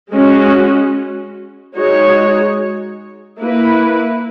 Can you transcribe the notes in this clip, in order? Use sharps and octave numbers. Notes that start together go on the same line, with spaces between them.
G#3 C#4 F#4
G#3 D#4 F#4 C#5
A#3 E4 B4